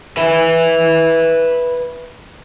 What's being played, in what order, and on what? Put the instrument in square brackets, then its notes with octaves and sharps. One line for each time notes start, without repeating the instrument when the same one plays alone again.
[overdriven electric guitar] B4 E5